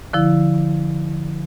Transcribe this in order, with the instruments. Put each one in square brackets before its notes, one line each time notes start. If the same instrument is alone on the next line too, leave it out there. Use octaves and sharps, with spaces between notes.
[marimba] D3 F3 E4